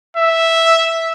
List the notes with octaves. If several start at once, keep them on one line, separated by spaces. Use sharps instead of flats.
E5